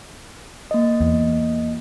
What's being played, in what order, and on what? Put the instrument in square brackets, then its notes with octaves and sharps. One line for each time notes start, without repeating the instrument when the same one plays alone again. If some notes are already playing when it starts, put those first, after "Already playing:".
[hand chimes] A#3 D#5
[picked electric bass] E2